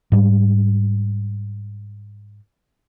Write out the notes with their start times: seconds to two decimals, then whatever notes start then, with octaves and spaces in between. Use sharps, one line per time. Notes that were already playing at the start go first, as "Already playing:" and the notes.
0.12 G#2 G3